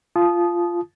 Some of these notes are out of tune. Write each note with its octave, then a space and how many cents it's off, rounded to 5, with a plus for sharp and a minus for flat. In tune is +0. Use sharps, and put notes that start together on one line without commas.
F4 -10 A5 -30 D#6 -10